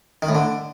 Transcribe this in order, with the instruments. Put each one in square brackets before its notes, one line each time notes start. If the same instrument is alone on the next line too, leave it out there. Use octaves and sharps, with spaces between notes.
[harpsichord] D#3
A2
D3